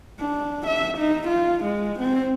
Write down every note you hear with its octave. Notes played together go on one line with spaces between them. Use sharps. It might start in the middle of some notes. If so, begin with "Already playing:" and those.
D4
E5
D#4
F4
G#3
C4